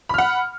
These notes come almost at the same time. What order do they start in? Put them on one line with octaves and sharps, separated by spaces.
B5 F6 F#5